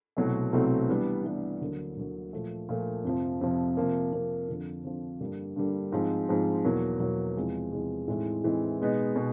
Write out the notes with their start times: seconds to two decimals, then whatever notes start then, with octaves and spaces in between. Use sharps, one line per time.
0.17 C2 B2 F#3 A3 C4
0.53 C2 B2 F#3 A3 C4
0.88 E3 G3 B3 D4
1.24 E3 G3 B3 D4
1.61 D2 D3 F#3 A#3
1.97 D2 D3 F#3 A#3
2.33 A#2 F3 A3
2.69 A#2 F3 A3
3.04 F2 C3 F3
3.41 F2 C3 F3
3.77 C3 F3 A#3
4.12 C3 F3 A#3
4.48 F2 D3 F3
4.84 F2 D3 F3
5.20 G2 D3 G3 A#3
5.56 G2 D3 G3 A#3
5.92 G#2 F3 G#3 C4
6.29 G#2 F3 G#3 C4
6.65 E2 B2 F#3 A#3
7.00 E2 B2 F#3 A#3
7.37 E2 C3 F3 G#3
7.72 E2 C3 F3 G#3
8.08 A2 E3 G#3 C4 D#4
8.44 A2 E3 G#3 C4 D#4
8.80 B2 G#3 B3 D#4
9.16 B2 G#3